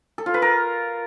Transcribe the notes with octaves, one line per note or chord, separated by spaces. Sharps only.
A4
F4
B4
A#4